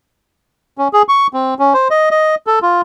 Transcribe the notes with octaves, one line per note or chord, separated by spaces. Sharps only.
C#4
G#4
C#6
C4
C#4
C5
D#5
D#5
A4
F4